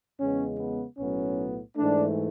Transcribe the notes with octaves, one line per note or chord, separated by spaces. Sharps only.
E2 C#3 G#3 B3 C#4
B3
B1 A2 F#3 B3 C#4
G#2 E3 A3 D4